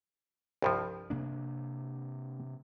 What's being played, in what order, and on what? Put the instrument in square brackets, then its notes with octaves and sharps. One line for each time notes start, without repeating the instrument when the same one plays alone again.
[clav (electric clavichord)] C2 G2 F3
[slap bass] C3 A#3 D4